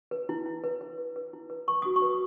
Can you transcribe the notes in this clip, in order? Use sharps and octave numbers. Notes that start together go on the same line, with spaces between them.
B4
E4
E4
B4
B4
B4
B4
E4
B4
B4 C#6
F#4 D#6
C#6
B4